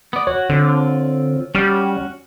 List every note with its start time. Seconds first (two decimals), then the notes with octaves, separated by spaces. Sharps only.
0.13 B3 D5
0.27 F#4 C#5
0.50 D3 C4 F4
1.55 G3 C#4 F#4 F6